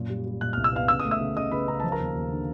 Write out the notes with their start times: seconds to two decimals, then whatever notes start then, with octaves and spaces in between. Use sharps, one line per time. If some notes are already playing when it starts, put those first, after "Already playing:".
Already playing: F#2 A#2
0.10 G3
0.26 G3
0.41 A#2 F#6
0.53 C2 F6
0.64 E6
0.73 B3 F5 F6
0.88 C#3 E6
1.00 D#6
1.05 A3
1.11 E5 E6
1.21 C#3
1.36 C#3 D#5 D#6
1.52 C#3 B4 B5
1.68 C#3 A#5
1.80 F3 A5
1.92 A#4 A#5
2.00 D#2
2.15 D#2
2.31 D3